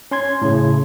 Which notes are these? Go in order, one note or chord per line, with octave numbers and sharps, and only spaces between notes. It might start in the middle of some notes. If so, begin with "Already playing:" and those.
C#4 C6 G#6
A2 C#3